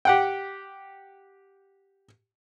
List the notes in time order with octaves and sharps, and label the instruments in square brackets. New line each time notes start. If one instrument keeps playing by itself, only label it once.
[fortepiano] G4 F#5 G5